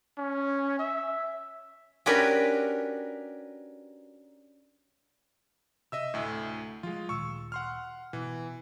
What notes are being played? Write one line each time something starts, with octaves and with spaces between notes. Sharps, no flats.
C#4
E5
C#4 D4 F#4 G4 A#4 B4
C3 D#5 E5 E6
D2 A2
F3 F#3 G#3 F4
D2 A#2 D#3 C#6 E6
F#5 C6 F6
B2 E3